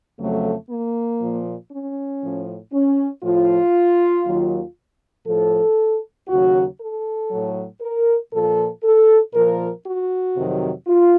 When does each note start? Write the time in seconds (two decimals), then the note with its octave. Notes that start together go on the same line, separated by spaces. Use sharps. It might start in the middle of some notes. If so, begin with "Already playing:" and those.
0.18 F2 C#3 F#3 A3
0.69 A#3
1.20 A#2 F3
1.71 C#4
2.22 A2 F3
2.73 C#4
3.23 A2 F3 F4
4.26 D#2 D#3 F#3
5.26 A2 F3 A4
6.28 D#2 C#3 F#3 F#4
6.80 A4
7.30 A2 F#3
7.81 A#4
8.32 A#2 F3 A4
8.83 A4
9.34 A#2 F3 A#4
9.85 F#4
10.36 F2 C3 D#3 F#3
10.87 F4